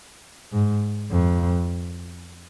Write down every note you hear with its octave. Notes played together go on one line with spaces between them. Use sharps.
G#2
F2